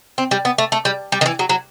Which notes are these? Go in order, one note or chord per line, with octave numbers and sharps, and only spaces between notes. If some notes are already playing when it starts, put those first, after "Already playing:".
C4
G3
B3
A3
A3
G3
G3
D#3
E3
F#3
F#3